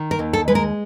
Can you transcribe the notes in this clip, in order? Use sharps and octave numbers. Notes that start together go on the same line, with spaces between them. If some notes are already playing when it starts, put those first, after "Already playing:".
Already playing: D#3
A#4
D#2
A4
G#3 B4
A#4